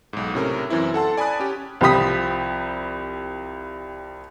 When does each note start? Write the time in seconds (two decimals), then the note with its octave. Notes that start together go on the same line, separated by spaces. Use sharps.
0.13 B1 G#2
0.34 A2 C3 C#4 A#4
0.70 F#2 E3 C4 E4
0.94 A4 F#5 A5 C6
1.17 D5 G#5 A5 B5 D#6 F#6
1.40 C#4 G4
1.81 C2 F3 G4 B5 D#6 B6